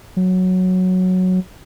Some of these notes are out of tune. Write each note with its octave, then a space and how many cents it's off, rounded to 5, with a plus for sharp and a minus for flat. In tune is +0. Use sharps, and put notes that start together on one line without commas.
F#3 -5